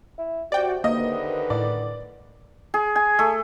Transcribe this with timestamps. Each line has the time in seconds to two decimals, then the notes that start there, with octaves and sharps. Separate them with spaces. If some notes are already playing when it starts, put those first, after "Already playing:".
0.18 E4
0.52 C3 F#4 D5 G5
0.84 D3 D#3 A#3 B4 D#5
1.50 A2 D5
2.74 G#4
2.96 G#5
3.19 A3